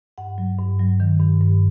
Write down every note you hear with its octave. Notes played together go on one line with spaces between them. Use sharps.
G2 F#5
F#3
G2
F#3
D#3
G2
G2